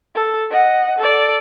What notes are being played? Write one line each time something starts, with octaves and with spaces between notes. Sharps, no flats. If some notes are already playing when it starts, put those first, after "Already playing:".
A4
D#5 F#5
A4 D5